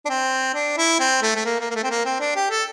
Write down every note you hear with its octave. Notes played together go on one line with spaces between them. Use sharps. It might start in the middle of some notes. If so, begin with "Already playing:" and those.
D4
C4
D4
E4
C4
A3
A3
A#3
A#3
A#3
A3
C4
A#3
C4
D4
G4
A4